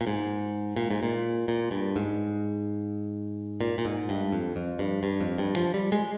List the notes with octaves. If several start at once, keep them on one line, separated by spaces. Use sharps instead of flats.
A#2
G#2
A#2
G#2
A#2
A#2
G2
G#2
A#2
A#2
G#2
G2
F2
F2
G2
G2
F2
G2
F3
G3
G#3